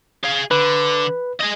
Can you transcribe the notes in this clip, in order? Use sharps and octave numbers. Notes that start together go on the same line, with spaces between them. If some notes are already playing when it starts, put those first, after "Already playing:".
G#4 F5
D3 B4
G#4 D#5